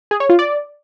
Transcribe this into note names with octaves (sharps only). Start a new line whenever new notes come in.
G#4
C#5
F4
D5